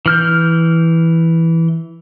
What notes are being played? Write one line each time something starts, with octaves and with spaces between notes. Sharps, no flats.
E3 F6 G6